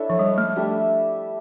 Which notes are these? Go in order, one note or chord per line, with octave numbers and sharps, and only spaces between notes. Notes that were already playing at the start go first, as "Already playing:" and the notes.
Already playing: D4 E4 A4 C#5 E5
F3
G3
A3
G3 D4 A4 E5